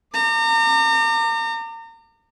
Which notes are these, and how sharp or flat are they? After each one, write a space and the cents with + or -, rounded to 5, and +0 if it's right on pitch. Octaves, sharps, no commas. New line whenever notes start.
A#5 -35 D6 +25